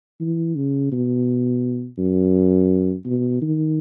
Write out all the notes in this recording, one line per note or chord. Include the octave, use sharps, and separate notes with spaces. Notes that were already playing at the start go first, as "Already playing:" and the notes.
E3
C#3
B2
F#2
B2
D#3